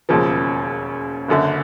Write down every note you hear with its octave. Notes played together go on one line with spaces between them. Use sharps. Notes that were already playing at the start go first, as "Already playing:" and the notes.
E1 D#2 C#3 F3
F#1 F#2 D3